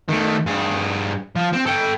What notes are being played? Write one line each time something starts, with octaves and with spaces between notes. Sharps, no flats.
D#3 A3
G2 G#4
F3
C4
A4 G5